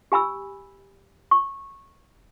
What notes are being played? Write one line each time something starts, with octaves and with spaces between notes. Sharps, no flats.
G4 G#5 B5 E6
C#6